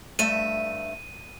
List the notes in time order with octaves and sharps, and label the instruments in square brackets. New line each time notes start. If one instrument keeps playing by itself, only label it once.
[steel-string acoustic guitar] G2 A3 E5 [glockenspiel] D#7